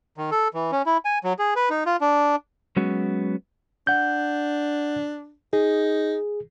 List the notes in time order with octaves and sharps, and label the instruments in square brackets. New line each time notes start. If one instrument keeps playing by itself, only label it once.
[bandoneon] D#3
A4
E3
C#4
E4
G#5
F#3
G#4
B4
D#4
F4
D4
[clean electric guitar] F#3 G#3 B3 C#4 F#4
[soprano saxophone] D4 [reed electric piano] F#5 G6
[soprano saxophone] D#4 [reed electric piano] G#4